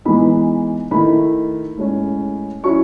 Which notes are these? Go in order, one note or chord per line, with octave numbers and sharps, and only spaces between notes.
E3 G#3 B3 D#4 B5
D#3 A3 E4 B5
A2 G#3 C#4
F#3 C#4 E4 C#6